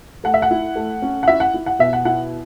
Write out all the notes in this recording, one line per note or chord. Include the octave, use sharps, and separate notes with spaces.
A3 F#5
E5
F#5
E4
A3
C#4
F#5
E4 E5
F#5
E4
F#5
B2 E5
F#5
E4 F#5